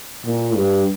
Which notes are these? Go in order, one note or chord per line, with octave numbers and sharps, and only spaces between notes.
A#2
G2